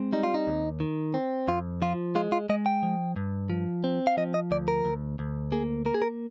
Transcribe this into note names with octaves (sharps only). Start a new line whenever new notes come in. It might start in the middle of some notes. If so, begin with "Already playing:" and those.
Already playing: G#3 C4
G3 D#4
F4
D#4
D#2
D#3
C4
F2 F4
F3 F4
G#3 F4
F4
G#3 D#5
G5
F3
G2
F3
C4
F5
F3 D#5
D#5
D2 D5
A#4
D2
D2
A#3 G#4
A#3 A#4
G#4
A#4